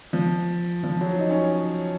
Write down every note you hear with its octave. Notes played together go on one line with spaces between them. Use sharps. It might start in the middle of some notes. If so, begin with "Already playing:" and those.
F3
F3
F#3
D#4
C#4